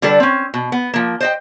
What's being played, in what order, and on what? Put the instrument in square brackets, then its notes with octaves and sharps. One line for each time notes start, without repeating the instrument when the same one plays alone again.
[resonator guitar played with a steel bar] D3 G3 D4 A4 B4
C4 C#4
B2
B3
F3 A#3
C5 D#5 G5